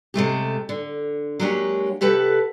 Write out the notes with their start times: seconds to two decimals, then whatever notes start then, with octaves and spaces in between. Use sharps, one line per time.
0.14 C3 G#3 A3 G4
0.69 D3
1.40 F#3 G#3 A#3 D4 G4 C#5
2.01 C3 G4 A4 B4 F#5